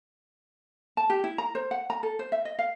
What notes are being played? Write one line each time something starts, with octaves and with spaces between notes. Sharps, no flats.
A5
G4
E4
A#5
C5
F#5
A#5
A4
C5
E5
D#5
F5